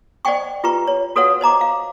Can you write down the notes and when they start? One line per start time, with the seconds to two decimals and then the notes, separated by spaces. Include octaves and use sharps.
0.25 C5 D5 D#5 F#5 G5 C#6
0.64 F4 G4 B4 A#5 C#6
0.87 C#5
1.16 F#4 A4 B4 C#5 F5 F#5
1.41 C5 D#5 A#5 D6
1.61 F5